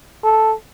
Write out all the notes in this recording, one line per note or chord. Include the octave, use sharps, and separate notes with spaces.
A4